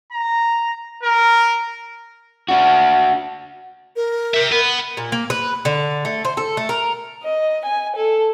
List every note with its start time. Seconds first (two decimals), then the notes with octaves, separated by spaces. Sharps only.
0.12 A#5
1.03 A#4
2.48 D4 F#4
3.96 A#4
4.34 G4 E5
4.52 B3 B4
4.97 A#2
5.12 A#3
5.30 B4
5.65 D3
6.05 A3
6.25 C5
6.37 A4
6.57 A3
6.69 A#4
7.24 D#5
7.65 G#5
7.97 A4